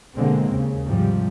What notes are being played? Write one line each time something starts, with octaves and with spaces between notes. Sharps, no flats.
B2 D3 G#3 A#3 C4
D#2 C#3
G#2 C3 F3 G3